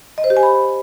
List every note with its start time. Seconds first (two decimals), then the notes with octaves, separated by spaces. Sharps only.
0.18 D#5
0.24 C5
0.30 G4
0.37 G#5
0.43 B5